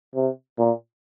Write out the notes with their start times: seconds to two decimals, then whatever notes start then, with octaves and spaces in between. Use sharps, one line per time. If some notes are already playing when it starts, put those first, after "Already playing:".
0.15 C3
0.59 A#2